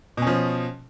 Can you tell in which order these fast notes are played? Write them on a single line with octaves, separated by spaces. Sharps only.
B2 C#4 F3